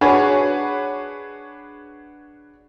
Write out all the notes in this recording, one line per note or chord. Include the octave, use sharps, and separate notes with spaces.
D4 F#4 G#4 B4 C#5